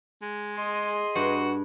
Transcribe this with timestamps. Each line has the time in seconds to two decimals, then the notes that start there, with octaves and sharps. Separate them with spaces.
0.22 G#3
0.56 G#4 D#5 C6
1.15 G2 F#4